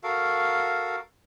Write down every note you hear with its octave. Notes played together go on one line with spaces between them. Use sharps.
F#4 A4 A#4 F5